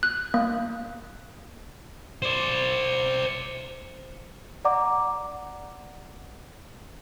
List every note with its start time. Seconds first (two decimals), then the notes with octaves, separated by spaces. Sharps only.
0.03 F#6
0.34 A#3
2.22 C5 D5
4.65 D5 F#5 A#5 D6